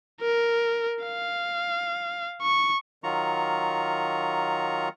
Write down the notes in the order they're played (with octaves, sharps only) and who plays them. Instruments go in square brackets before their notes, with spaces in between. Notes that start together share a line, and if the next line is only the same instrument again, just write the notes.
[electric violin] A#4
F5
C#6
[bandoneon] D#3 F#3 F4 A#5 C#6